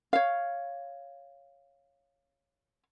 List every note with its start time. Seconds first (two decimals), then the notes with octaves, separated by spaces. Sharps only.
0.13 C#5 F5